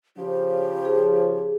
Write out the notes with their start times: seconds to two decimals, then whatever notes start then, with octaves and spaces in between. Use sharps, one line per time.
0.17 C#3 F3 G4
0.85 G#4